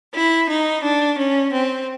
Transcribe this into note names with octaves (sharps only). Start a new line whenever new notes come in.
E4
D#4
D4
C#4
C4